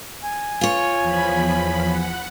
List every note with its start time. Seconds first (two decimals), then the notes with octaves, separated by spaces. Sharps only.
0.22 G#5
0.61 F4 C#5
1.00 E2 F3 B5
1.87 F#5